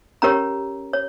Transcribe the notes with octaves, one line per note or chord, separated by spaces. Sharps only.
C#4 G4 A#4 C#5 A#5
C#5